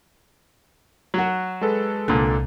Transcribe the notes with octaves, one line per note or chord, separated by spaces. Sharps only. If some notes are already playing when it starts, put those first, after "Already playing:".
F#3 F#4
G#3 A4 B4
C2 A#2 D3